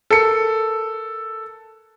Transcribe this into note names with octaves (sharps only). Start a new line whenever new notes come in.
A4 A#4 C#7